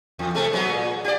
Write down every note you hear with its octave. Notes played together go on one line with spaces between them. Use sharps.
E2
C3 G#3 A3
F#3 G#3 B3
A#2
G4 D5